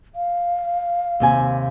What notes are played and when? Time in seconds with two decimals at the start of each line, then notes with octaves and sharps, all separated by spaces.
0.15 F5
1.20 D#2 C3 G#5